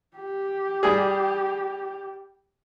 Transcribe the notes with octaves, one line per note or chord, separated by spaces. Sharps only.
G4
G3 G#4